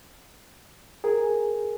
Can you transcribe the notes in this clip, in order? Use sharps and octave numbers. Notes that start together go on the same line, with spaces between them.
G#4 A#4 G#5